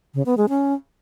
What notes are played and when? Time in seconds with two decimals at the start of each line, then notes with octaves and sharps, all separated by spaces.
0.14 C#3
0.26 B3
0.37 G#3
0.49 C#4